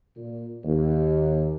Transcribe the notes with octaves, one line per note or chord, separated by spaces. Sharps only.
A#2
D#2